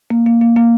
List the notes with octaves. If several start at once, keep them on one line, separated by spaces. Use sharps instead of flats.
A#3
A#3
A#3
A#3